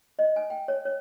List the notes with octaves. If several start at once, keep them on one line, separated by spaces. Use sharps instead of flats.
D#5
G#5
G5
C#5
C#5